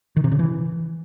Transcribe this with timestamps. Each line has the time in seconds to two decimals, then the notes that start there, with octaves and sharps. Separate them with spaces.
0.17 D#3
0.24 C3
0.32 C#3
0.39 E3